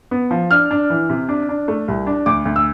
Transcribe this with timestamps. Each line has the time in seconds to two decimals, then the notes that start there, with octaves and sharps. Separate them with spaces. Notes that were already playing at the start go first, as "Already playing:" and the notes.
0.11 B3
0.31 F3
0.51 D4 F6
0.71 D4
0.90 E3
1.10 C3
1.29 D4
1.49 D4
1.68 A3
1.88 C2
2.07 D4
2.26 D2 D6
2.45 D2
2.56 E6